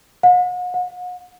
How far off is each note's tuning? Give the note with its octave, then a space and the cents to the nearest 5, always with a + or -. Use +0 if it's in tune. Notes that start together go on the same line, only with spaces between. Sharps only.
F#5 -45
F#5 -40